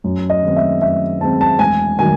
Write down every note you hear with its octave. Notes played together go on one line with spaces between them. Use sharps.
F#2
D#5
D#3 G#3 C4
E5
F#2 E5
D#3 G#3 C4 A5
A5
E1 G#5
D#3 F#3 G#5